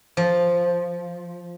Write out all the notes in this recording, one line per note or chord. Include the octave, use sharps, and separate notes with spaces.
F3